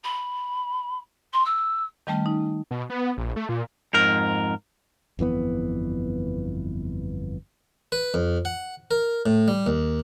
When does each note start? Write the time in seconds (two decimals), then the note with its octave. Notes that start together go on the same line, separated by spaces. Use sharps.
0.04 B5
1.33 C6
1.45 E6
2.07 D#3 G3 A3 C#4
2.26 D#4
2.71 B2
2.90 B3
3.17 A#1
3.36 A3
3.49 A#2
3.93 F2 G#2 A#4 A#5
5.19 G1 F2 E3 B3
7.92 B4
8.14 F2
8.45 F#5
8.91 A#4
9.26 A2
9.48 G3
9.66 D#2